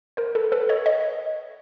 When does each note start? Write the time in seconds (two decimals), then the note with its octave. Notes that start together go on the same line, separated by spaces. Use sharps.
0.17 A#4 C5
0.35 A4 B4
0.52 A4 B4
0.69 C#5 D#5
0.86 C#5 D#5